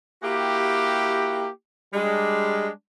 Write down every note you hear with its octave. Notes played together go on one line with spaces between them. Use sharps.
A#3 E4 F#4 G4
G3 G#3 D4